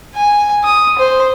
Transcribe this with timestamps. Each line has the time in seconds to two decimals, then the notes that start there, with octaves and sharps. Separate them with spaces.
0.15 G#5
0.64 D#6
0.99 C5